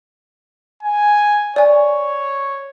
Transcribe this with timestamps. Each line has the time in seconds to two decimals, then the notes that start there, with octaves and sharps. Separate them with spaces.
0.83 G#5
1.56 C#5 D5 G#5